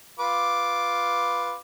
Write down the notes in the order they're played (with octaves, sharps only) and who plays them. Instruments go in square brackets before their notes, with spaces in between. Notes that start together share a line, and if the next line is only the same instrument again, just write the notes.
[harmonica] F4 B4 D6